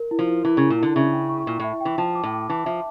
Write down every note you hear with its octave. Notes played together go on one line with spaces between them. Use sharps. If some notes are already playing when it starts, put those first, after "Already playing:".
Already playing: A#4
E4
F3
E4
E3 E4
C#3 E4
A#2
D3 E4
C#3 E5
G5
C#6
A#2 C#6
A2 E5
E3 G5
F3 A5
D6
A2
D6
E3 A5
F3 E5